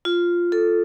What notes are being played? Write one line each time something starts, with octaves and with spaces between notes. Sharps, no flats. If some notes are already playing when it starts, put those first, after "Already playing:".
F4
A4